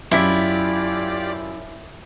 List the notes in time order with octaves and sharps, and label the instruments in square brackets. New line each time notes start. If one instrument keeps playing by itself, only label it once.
[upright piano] F#2 B6 [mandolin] E4 [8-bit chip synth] F4 G4 D5